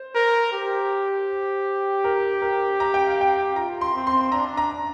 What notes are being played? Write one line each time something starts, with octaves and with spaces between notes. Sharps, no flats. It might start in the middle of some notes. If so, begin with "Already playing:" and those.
Already playing: C5
A#4
G4
A#4
A#4
A#5
G5
F5
G5
F4 A#5
C6
C4
C6
D4 A#5
A#5